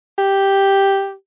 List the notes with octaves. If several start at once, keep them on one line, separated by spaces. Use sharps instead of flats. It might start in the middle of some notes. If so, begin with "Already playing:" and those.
G4